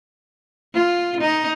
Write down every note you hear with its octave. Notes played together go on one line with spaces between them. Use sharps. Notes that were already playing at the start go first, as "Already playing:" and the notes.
F4
D#4